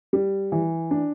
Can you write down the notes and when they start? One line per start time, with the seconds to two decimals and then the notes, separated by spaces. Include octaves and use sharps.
0.13 G3
0.52 E3
0.91 D4